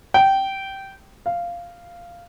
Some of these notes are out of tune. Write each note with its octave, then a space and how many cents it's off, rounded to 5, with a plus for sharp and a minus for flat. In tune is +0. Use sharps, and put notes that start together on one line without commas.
G5 -15
F5 -10